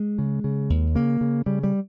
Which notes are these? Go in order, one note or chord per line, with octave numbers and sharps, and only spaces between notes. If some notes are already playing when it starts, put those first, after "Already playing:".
Already playing: G#3
C#3
C#3
D#2
C#3 A#3
C#3
C#3 G3
G3